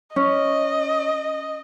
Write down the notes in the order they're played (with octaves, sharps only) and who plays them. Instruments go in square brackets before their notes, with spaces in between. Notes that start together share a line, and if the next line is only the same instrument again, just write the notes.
[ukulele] C#4 [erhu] D#5